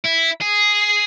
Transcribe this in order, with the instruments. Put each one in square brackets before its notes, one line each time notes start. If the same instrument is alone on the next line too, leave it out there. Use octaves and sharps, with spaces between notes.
[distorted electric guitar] E4
G#4